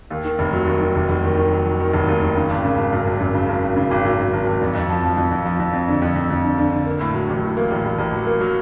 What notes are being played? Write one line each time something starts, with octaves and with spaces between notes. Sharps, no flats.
D#2
D#3
F1
F#3
D#2
D#3
F1
F1
D#3
D#3
F#3
F#3
D#3
F1
D#2
D#3
C#3
G#1
C#3
G#1
F#2
G#1
F#2
C#3
G#1
G#1
C#3
G#1
F#2
F#2
G#1
G#1
F2
F2
F3
F3
F2
F2
F3
F2
F2
D3
F2
F2
F2
D3
D3
D3
A#3
A2
F#3
A1
A2
A#3
A1
A1
A1
F#3
A#3
F#3